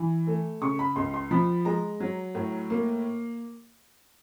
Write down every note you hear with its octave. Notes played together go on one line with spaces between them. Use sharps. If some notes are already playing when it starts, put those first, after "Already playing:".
Already playing: E3
A3
C#3 C#6
B5
C#2 C6
C6
F3 B5
G#3 A#5
F#3
A2
A#3